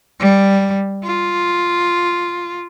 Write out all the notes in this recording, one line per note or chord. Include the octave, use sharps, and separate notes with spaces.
G3
F4